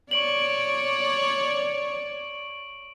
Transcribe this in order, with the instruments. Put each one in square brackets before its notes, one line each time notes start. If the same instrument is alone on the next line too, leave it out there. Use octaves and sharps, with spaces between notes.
[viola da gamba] C#5 D5 [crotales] C#6 D7 F#7